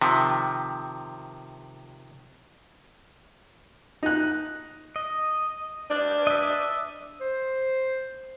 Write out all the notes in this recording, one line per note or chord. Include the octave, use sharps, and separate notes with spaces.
C3 D#3 F3
D#4 F#6
D#5
D4
D#5 E5
C5